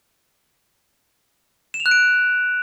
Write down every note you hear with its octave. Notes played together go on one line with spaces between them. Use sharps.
E7
F7
F#6
D7